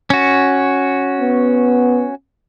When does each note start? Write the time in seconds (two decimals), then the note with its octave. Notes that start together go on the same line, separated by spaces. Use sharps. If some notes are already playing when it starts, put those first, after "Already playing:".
0.10 C#4 F#4
1.21 B3